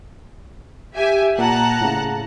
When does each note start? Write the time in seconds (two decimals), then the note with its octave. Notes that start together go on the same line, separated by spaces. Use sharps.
0.95 G4 E5 G#5
1.38 A#2 F#5 A5 A#5
1.81 A2 C#3